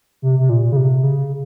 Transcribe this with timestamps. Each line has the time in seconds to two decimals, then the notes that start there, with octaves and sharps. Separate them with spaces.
0.22 C3
0.39 C3
0.49 A#2
0.72 C#3
0.76 C3
1.03 C#3